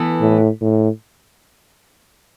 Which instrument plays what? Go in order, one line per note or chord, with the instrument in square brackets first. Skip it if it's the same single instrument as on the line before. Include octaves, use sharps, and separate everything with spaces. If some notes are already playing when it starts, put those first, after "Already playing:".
Already playing: [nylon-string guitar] E3 B3 E4 A4
[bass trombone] A2
A2